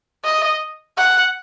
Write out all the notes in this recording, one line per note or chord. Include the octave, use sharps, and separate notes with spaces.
D#5
F#5